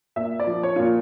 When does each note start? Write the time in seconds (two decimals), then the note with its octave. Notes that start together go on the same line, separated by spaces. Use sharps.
0.16 A#2 E5
0.40 D5
0.47 F3
0.63 C#5
0.76 A#2 F4